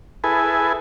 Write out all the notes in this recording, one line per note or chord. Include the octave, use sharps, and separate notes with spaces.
E4 G#4 A4 B4 G#5